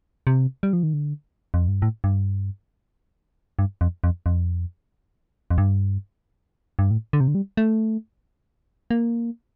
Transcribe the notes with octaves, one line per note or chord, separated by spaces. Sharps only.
C3
G3
F3
D#3
D3
F2
G2
A2
G2
G2
F2
F2
F2
F2
G2
G2
A2
D3
C3
D3
G3
A3
A#3